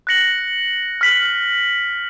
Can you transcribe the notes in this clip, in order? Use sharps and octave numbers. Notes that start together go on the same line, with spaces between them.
F#6 A#6 C#7 F#7
F6 B6 F#7